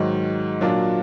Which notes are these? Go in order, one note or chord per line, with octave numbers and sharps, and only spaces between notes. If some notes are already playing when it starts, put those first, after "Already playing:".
Already playing: G#2 D#3 F#3
A#2 F#3 A#3 D4 F4